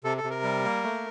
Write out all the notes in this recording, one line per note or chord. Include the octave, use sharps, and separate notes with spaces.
C3 A4
A4
C3
A#4
G3
A#3
A3